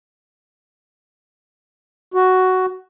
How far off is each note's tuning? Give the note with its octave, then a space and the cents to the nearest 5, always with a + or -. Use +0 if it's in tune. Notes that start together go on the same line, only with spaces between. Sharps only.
F#4 +5